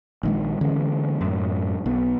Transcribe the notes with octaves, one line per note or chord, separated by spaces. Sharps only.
A#1 D#3 G#3
D3 E3 G#3 C#4
F#2 A2
B1 B3